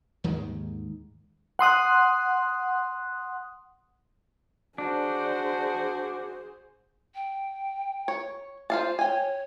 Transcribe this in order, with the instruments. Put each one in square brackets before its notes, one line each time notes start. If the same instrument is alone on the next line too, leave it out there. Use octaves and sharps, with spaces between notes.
[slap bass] D#2 G#2 D#3 G#3
[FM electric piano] F#5 C6 D#6 F#6
[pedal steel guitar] D4 [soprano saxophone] F#4 [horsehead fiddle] G#4 C5
[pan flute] G5
[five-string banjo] C#5
[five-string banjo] F4 F5 A5 [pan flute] C5
[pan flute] C#5 [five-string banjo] G5 G#5